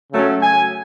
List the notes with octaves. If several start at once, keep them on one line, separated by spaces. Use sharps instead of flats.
C#3 F#3 A3 C#4
G#5